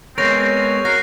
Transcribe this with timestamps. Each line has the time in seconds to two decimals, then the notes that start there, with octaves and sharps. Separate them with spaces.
0.18 G#3 B3 C4 A#4 C#5 C#6 A#6 F7
0.40 C4
0.85 F#4 A#4 F#6 A#6 C7